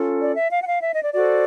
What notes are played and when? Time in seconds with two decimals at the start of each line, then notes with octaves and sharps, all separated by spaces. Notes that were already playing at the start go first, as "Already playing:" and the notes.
Already playing: C#4 F4 A4
0.20 D5
0.36 E5
0.51 F5
0.62 F#5
0.67 F5
0.82 E5
0.93 D#5
1.03 D5
1.13 F#4 A4 C5 D5